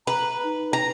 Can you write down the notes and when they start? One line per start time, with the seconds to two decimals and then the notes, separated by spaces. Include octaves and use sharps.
0.07 B4 A#5
0.44 D#4
0.73 A#5